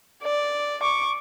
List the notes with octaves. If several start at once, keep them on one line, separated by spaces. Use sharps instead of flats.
D5
C#6 D6